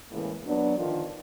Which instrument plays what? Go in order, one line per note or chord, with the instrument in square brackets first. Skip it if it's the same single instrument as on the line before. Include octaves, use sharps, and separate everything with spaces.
[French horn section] E2 A2 C#3 E3 G#3 A#3
F#3 B3 D4
D3 D#3 F3